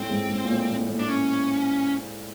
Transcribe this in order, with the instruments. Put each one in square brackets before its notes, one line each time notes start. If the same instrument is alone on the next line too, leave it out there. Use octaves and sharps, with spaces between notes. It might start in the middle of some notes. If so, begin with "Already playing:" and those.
Already playing: [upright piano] A2 [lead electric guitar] C4
[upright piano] G#2
G#2
A#2
A2
A2
A2
[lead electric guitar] D4
C#4